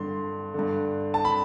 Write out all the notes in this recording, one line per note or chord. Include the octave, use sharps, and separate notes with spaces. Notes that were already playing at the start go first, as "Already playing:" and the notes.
Already playing: G2 D3 C6
G2 D3
A5
B5